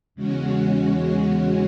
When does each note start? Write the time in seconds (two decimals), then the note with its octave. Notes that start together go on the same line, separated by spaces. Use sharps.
0.15 E2 C#3 G#3 C#4 F#4